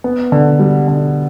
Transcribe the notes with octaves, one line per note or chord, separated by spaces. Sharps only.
B3
D3
G3
D3